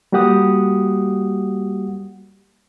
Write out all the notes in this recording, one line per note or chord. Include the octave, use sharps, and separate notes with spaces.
G3 A#3 F#4 G4 F#5 D#6